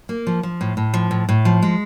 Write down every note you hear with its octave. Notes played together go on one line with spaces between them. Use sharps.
A#3
F3
F3
A2
A2
F3
A2
A2
F3
G#3